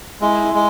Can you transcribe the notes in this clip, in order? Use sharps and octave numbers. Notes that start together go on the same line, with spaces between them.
G#3 E4
E4
G#3